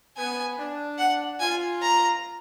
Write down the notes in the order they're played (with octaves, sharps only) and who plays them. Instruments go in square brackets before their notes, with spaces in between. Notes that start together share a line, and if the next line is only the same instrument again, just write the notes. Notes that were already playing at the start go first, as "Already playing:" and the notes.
[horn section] B3 [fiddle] G#5
[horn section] D4
[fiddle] F#5
[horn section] F4 [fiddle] G#5
[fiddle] A#5